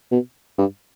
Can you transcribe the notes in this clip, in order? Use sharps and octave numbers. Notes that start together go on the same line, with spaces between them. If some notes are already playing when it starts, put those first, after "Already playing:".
B2
G2